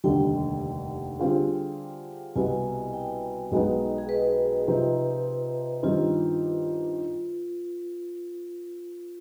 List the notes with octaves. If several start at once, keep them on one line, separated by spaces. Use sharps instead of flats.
F1 D#2 D3 G3 G5
D3 G3 C4 F4 G#4
C2 B2 B3 G#5
G5
B1 B2 G#3 B3 D#4
G#4
B4
C3 F3 C4 D#4
G2 D#3 G3 C4 D#4 F4